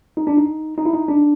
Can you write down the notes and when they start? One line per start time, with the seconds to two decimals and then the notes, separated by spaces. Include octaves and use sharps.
0.17 D#4
0.27 D4
0.37 D#4
0.78 D#4
0.86 E4
0.93 D#4
1.08 D4